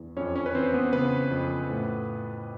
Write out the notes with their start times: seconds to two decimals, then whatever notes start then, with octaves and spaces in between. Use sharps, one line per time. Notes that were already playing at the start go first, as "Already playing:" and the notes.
Already playing: E2
0.17 F2 C#4 C#5
0.36 C#4 C#5
0.46 B4
0.55 E3 C4 C5
0.74 B3 B4
0.93 C#3 B3 B4
1.31 F2
1.70 A2